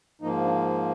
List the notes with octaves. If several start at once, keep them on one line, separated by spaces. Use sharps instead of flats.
G#2 F3 A#3 D#4
D4